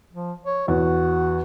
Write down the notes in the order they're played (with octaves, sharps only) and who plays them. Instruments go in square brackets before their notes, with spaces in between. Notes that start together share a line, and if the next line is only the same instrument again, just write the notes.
[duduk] F3
C#5
[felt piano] E2 [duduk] F#4